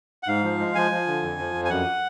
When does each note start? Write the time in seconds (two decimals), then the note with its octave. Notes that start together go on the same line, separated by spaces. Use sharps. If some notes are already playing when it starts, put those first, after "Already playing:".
0.23 F#5
0.28 G#2 F5
0.43 F3
0.59 G#3
0.75 F3 G#5
0.91 F3
1.07 D3
1.22 F2
1.39 F3
1.55 F2
1.65 G#5
1.70 F#2 F#5